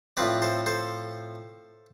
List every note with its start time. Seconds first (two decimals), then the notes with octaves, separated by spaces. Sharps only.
0.17 A2 F3 C4 B4 D5
0.42 A4 C5
0.66 A4 C5